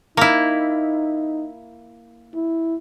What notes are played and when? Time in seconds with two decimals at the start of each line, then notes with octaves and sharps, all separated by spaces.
0.17 A#3 D#4 E4
2.35 E4